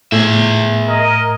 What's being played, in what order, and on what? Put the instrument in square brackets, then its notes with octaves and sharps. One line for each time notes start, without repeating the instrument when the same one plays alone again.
[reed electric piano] A2 [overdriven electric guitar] G#4 E5
[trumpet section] A#4 D#5